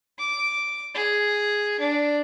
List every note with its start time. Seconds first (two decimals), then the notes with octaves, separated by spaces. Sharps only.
0.18 D6
0.94 G#4
1.80 D4